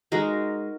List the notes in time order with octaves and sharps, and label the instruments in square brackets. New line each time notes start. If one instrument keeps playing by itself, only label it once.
[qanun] G#3 D#4 F#4 A#4